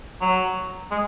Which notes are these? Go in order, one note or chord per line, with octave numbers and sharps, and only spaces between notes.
F#3
G#3